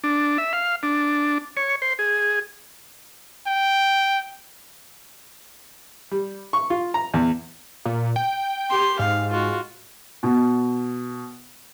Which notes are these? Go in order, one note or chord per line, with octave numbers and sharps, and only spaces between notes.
D4
E5
F5
D4
C#5
C5
G#4
G5
G3
C#6
F4
A#5
E2
A#2
G5
G4 C6
G#2 F5
F4 F#4
B2